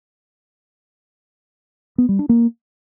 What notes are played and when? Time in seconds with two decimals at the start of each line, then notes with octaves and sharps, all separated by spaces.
1.98 B3
2.09 G3
2.19 D4
2.29 A#3